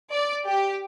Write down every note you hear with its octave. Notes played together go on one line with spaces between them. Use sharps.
D5
G4